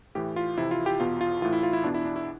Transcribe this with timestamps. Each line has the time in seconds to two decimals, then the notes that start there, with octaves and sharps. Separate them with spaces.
0.15 A2 E3 G4
0.36 F4
0.57 F2 C3 E3 E4
0.71 F4
0.86 G4
1.00 E2 B2 F4
1.21 F4
1.42 A2 E3 F4
1.52 E4
1.63 F4
1.73 E4
1.84 E2 B2 D4
1.94 E4
2.05 D4
2.16 E4